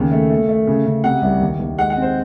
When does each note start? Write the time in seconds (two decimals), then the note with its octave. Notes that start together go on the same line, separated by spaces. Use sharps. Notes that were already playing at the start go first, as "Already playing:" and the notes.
Already playing: D#2 C#3
0.11 A3
0.30 A3
0.48 A3
0.67 C#3
0.85 C#3
1.04 C3 F#5
1.22 C2
1.40 D#2
1.59 D#2
1.78 G#3 F#5
1.90 F#5
1.97 C4
2.02 C5